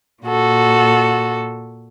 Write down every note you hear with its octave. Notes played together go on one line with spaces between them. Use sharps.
A#2 F#4 A4